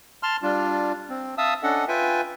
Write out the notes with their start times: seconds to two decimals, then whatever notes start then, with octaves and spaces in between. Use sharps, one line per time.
0.23 A5 C6 F6
0.43 G3 D4 F4
1.09 C4
1.38 E5 F5 A5 D#6 E6
1.63 C#4 D4 A4 D#5 F#5
1.88 F4 B4 E5 G5 G#5